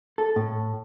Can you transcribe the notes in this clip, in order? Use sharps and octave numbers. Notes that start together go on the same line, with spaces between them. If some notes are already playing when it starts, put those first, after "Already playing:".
A4
A2